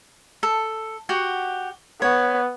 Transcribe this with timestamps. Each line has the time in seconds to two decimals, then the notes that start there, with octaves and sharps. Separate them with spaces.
0.43 A4
1.09 F#4 G4 F#5
2.02 B3 C#5